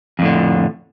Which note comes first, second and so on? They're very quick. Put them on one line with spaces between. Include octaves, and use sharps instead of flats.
F2 A2 D3